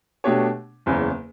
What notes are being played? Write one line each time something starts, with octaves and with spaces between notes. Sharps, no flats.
B2 A3 D4 G4 C#5
F#1 E2 C#3